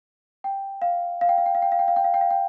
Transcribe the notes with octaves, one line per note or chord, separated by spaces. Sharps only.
G5
F5
F5
G5
F5
G5
F5
G5
F5
G5
F5
G5
F5
G5
F5
G5